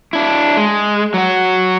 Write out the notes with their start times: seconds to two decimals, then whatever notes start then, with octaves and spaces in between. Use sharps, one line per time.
0.13 D4 E4
0.57 G#3
1.14 F#3 F#4